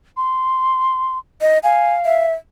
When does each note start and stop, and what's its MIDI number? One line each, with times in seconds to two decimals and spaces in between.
0.17 1.18 84
1.41 1.59 75
1.63 2.25 77
1.63 1.93 80
2.05 2.33 76